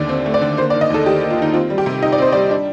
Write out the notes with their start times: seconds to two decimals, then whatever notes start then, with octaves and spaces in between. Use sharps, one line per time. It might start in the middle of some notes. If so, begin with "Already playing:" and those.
Already playing: D#2 D3 A3 D5
0.09 C4
0.26 A3
0.34 D5
0.41 D3
0.57 A#3 C5
0.70 D5
0.74 D#3
0.81 D#5
0.90 D#2 A4
1.06 D#2 G4
1.21 A#3
1.30 F4
1.38 D#3 D#4
1.54 C4 F4
1.70 G3
1.78 G4
1.86 C3
2.02 D#4 D#5
2.12 D5
2.18 C4 C5
2.32 G3 D5
2.51 D4